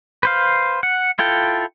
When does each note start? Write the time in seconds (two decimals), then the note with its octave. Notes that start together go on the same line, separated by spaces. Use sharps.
0.23 B4 C5 F5
0.83 F#5
1.19 E4 F4 A4 G5